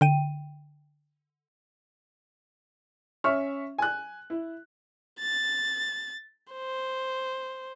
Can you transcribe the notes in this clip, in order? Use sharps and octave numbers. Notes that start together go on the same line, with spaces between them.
D3 G5 D#7
C#4 E5 C#6 F6
G#5 F#6
E4
A6
C5